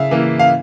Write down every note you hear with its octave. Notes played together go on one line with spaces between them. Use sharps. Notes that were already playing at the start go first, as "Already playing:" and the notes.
Already playing: C#3 E5 F5
E3 A#3
F5